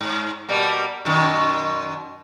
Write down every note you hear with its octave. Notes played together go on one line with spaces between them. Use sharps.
G#2
B2 G3 A#3
F#2 B2 D#3